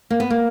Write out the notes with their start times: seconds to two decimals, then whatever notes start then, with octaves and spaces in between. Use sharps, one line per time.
0.10 A#3
0.20 B3
0.30 A#3